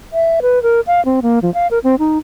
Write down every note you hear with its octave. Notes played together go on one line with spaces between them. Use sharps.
E5
B4
A#4
F5
C4
A#3
F3
F5
A#4
C4
D#4